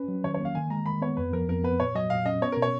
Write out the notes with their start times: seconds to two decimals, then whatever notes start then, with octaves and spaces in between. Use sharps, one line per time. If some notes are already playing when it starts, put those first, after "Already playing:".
Already playing: C#4 B4
0.08 F#3
0.24 D#3 C#5
0.34 C#5
0.40 A#3
0.45 F5
0.55 D#3 G#5
0.70 G#3 A#5
0.86 D#3 B5
1.02 B3 C#5
1.17 F2 B4
1.33 F3 A#4
1.49 F2 A#4
1.64 B3 B4
1.80 A#2 C#5
1.95 F#3 D#5
2.10 A#2 F5
2.26 C#4 D#5
2.42 B3 C#5
2.52 B2 A#4
2.62 C#5